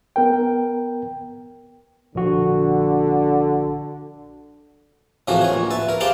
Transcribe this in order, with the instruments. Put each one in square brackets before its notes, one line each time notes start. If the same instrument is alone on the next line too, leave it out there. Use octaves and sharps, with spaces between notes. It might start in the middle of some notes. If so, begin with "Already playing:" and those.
[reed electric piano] B3 A#4 G5
[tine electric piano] A#1 F#4 [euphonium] D3
[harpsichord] A2 C3 E3 F3 F#4 G#4
G#4 C#5
A#1
B4 E5 A5
A#4 B4
G4 G#4 C5 F5 G5 A5